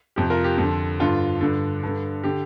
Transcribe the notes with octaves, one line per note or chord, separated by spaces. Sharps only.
F2 C3 G4
F4 A#4
G4
F2
D3
G2 D3 F4
G2 D3
G2 D3
D3 G4